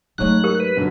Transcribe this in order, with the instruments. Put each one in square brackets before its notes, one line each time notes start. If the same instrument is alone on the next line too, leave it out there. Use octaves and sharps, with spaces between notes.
[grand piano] G#2 C#5 [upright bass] F#3 A3 [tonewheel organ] F#6
[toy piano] G4 A#4
[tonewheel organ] B4
[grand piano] F#2 D3 F#3